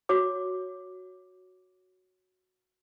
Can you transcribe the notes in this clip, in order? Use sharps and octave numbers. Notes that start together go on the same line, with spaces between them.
F#4 C#5 D6